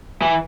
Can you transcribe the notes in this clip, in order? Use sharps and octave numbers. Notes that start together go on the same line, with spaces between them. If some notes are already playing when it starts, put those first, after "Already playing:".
E3